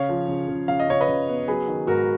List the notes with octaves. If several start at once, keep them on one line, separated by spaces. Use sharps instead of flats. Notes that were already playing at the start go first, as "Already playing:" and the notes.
Already playing: C#3 C#5 F5
F3
C#3
C#3
C#3 F5
D#5
C#3 C#5
B4 D#5
C#3
B3
F#3 G#4 B4
D#3
G#2 F#4 A#4